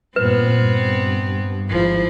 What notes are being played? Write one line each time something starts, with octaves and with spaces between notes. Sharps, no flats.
G2 A#2 B3 C4 B4
G2
G#1 F3 E4